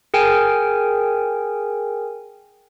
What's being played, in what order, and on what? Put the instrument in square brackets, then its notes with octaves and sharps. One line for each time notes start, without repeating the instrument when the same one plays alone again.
[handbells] G#4 A#4 G5 G#5